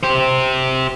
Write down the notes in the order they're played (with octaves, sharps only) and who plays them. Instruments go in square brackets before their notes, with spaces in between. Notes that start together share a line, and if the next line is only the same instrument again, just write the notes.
[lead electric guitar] G4 C5